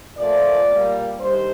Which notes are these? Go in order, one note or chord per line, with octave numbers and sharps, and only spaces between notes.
A#2 F3 A3 D5
A#2 G3 A#3
G2 D#3 G3 C5